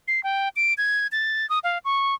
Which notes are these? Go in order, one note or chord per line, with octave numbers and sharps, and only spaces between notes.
C7
G5
D7
G#6
A6
D#6
F5
C#6